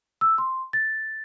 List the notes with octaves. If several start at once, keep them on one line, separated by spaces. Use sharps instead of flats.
E6
C6
A6